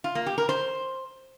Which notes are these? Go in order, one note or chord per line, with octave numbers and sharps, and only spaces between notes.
F4
A#3
G4
A#4
C5